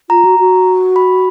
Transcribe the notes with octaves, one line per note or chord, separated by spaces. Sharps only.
F4 A#5
F#4
F#4
B5